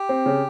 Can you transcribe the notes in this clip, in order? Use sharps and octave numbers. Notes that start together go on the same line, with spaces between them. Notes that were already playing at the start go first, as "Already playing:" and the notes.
Already playing: G4
C4
C#3